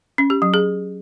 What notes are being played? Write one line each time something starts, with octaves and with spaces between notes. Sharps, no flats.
C#4
G4
F#3
G#4